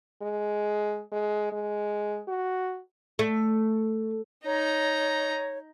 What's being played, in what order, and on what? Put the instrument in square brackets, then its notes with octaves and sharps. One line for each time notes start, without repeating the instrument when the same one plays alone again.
[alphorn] G#3
G#3
G#3
F#4
[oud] A3
[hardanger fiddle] D#4 A#5 [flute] C#5